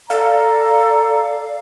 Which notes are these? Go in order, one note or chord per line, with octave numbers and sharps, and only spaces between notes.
A4 D5 F5 A#5